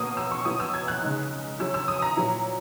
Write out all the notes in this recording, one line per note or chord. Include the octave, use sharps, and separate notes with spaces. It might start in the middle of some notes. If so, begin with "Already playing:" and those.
Already playing: B2 A#3 C#4 D#6
E6
C#6
B2 F#3 C#4 E4 D#6
E6
G#6
F#6
C#3 G#3 D#4
F#3 C#4 E4 E6
E6
D#6
A#5
A#2 F#3 C#4 E4